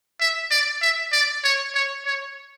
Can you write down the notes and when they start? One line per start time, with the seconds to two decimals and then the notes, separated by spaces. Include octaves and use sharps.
0.21 E5
0.51 D5
0.82 E5
1.12 D5
1.44 C#5
1.75 C#5
2.06 C#5